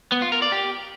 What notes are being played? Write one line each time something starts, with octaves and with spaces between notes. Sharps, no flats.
B3
F4
A#4
D5
G4